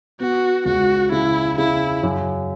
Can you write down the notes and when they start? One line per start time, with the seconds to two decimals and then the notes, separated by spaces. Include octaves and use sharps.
0.20 B3 F#4
0.65 C#2 F#4
1.12 C#3 E4
1.58 C#3 E4
2.03 F#2